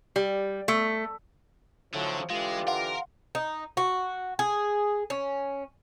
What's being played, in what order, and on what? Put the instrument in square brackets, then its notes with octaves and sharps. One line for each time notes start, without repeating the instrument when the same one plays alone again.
[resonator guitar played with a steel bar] G3
A3
[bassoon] A2 [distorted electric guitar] D3 [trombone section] F3 F#3
[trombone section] D3 E3 G4 [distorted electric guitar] G#3 [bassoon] F4
[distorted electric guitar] A#4 [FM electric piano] F5 F#5 C6
[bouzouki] D#4
F#4
G#4
C#4